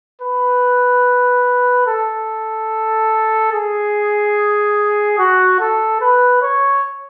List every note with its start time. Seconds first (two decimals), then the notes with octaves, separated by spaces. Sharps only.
0.21 B4
1.87 A4
3.52 G#4
5.19 F#4
5.60 A4
6.01 B4
6.42 C#5